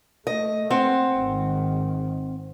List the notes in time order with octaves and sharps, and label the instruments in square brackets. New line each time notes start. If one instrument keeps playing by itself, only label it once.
[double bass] A3 [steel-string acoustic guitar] D#5
[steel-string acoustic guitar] C4 F#5
[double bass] G#1 D#3